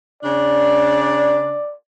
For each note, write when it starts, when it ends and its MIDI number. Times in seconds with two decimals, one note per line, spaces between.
0.23 1.61 49
0.23 1.61 62
0.23 1.74 74